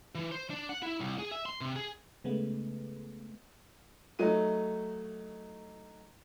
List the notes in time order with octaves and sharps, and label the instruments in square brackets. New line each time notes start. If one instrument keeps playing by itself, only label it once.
[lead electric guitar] E3
C5
D4
F#5
E4
C2
G#4
E5
C6
C3
G#4
[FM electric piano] C#3 G#3 A3 B3
[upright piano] F#3 A3 D#4 D#7